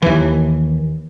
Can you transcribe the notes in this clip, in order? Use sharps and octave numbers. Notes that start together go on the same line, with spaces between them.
D#2 E3